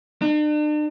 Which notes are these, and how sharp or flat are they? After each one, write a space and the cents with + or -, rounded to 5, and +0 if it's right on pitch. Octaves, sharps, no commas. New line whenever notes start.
D4 +45